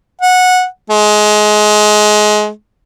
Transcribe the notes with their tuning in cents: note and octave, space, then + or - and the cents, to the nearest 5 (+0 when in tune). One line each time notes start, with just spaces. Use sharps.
F#5 -15
G#3 +25